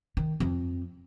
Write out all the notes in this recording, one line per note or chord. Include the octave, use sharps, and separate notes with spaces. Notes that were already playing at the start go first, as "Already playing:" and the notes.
D#3
F2